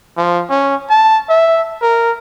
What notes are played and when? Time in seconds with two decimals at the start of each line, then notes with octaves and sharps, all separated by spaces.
0.17 F3
0.49 C#4
0.90 A5
1.29 E5
1.82 A#4